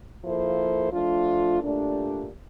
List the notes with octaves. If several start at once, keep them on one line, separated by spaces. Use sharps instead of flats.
F3 A#3 E4 A4 C5
F3 A3 D4 F4
A#2 A3 D4 G4